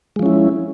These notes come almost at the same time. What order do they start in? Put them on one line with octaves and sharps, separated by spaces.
G#3 F3 C#4 E4